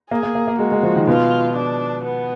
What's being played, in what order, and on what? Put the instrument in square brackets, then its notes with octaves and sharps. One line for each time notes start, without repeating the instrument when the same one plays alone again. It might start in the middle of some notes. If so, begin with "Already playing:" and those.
[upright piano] A#3 [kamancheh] G#4
[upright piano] A#3
A#3
A#3
[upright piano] G#3 [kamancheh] F#4
[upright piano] G#3
F3
D#3
[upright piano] B2 [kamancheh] F4
[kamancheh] D4
B3